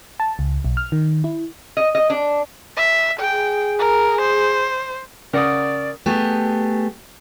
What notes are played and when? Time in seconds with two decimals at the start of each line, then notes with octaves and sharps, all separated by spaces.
0.20 A5
0.39 C#2
0.65 B1
0.77 F6
0.92 D#3
1.24 E4
1.77 D#5
1.95 D#5
2.10 D4
2.77 E5
3.20 G#4 G5
3.79 A#4
4.21 C5
5.33 C#3 A#4 D5 F#5 D#6
6.06 A3 B3 G4 G#4